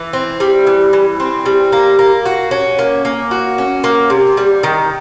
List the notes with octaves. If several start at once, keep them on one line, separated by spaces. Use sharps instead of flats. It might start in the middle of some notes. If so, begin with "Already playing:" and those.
Already playing: E3
C4
G3
E3
E3
C4
G3
A#3
A#3
F#4
C#4
A#3
A#3
F#4
C#4
A#3
C3
G3
D#3